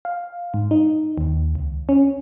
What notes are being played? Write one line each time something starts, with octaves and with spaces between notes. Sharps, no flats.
F5
G#2
D#4
D#2
C#2
C#4